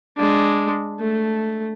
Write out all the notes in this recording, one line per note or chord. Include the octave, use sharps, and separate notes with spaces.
G#3 D4
A3